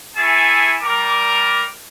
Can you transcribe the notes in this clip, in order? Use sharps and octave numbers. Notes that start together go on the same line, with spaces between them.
E4 G#4 E5 G#5 A5 C#6
G3 A#4 D6